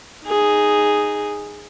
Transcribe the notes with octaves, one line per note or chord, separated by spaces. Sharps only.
D#4 G#4